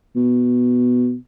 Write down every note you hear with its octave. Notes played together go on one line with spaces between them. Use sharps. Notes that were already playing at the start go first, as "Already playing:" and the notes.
B2